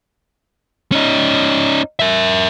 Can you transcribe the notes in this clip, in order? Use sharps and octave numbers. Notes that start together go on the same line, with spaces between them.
C#4 D#4
A#4 E5